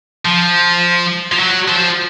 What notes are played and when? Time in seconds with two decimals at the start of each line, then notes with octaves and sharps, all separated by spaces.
0.25 F3
1.32 F3
1.39 F#3
1.68 F3